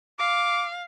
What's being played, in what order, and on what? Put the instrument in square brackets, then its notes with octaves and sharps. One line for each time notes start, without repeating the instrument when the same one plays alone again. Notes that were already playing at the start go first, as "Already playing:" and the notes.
[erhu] F5 [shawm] D6